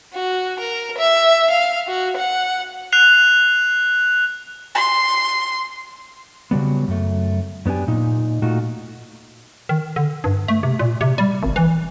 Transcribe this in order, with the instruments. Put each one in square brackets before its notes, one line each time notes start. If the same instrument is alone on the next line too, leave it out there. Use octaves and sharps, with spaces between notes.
[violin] F#4
A#4
E5
F5
F#4
F#5
[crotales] F#6 C7 F7
[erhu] C6
[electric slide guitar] C#3 F#3 G3 B3
F#2 A3
F#2 B3 D4 G4 G#5
A#2 D#4
A#2 A3 D#4 F4 F#4
[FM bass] D#3
D3
G2
A3
C3
A#2
C3
G3
G#1
E3